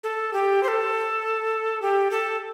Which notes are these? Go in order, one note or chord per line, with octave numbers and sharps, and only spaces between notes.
A4
G4
C5
A4
G4
A4